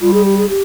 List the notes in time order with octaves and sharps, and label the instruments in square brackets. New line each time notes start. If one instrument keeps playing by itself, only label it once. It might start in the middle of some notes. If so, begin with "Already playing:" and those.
[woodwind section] G3 [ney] F4
[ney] G#4
G4
G#4
G4